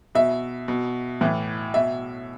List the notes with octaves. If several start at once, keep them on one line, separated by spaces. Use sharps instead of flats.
B2 E5
B2
A2 E3
B2 E5